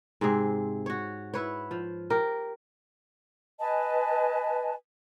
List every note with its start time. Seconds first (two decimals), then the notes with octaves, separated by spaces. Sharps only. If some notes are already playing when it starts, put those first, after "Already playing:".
0.21 G#2 C3 C4 G#4
0.86 F#4 C#5
1.34 E4 B4 C#5
1.71 F3
2.10 G4 A#4
3.60 B4 D#5 G#5 A5